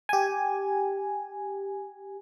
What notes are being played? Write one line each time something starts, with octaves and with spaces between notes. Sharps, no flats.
G4 G#5